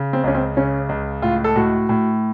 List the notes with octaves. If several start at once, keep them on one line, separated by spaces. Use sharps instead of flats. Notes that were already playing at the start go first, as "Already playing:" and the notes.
Already playing: C#3
C4
C#2 C#4
C4
C#3 C#4
C#2
A2 F4
A4
A2 F#4
A2